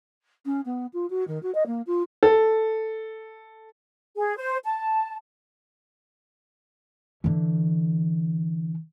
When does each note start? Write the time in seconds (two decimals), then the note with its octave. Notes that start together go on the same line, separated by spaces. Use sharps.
0.45 C#4
0.65 B3
0.93 F4
1.10 F#4
1.27 D#3
1.42 F#4
1.54 D#5
1.66 A#3
1.86 F4
2.23 A4
4.16 G#4
4.37 C5
4.64 A5
7.24 D3 E3